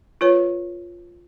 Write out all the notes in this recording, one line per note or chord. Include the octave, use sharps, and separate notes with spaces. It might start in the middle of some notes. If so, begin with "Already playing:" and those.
F4 B4 C#5